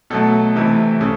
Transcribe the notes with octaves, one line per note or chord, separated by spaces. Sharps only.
B2 F#3 A3 A4
C3 E3 A3
C#3 A4